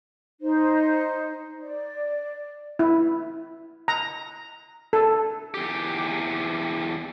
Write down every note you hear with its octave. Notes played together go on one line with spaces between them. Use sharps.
D#4 C5
D5
E4
A#5
A4
E2 G4